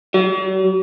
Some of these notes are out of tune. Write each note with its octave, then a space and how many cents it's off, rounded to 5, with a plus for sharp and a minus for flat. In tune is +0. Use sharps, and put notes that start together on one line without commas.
F#3 +45